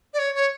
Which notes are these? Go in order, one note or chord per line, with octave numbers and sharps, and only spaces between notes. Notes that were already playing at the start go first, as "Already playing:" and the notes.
D5
C#5
C#5